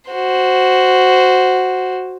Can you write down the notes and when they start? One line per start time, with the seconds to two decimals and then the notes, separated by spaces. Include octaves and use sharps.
0.11 F#4 C5